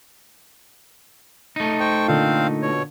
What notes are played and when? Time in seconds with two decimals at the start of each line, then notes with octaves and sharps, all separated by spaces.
1.56 A3 D#4
1.80 C5 G5 C#6
2.08 A#2 D3 C4 C5 F5
2.62 B2 C#5